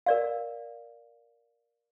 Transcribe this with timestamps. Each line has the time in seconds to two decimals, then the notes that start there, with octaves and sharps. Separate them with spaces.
0.06 A#4 D5 F5